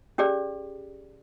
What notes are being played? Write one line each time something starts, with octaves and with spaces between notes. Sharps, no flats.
C#4 G4 G#4 D5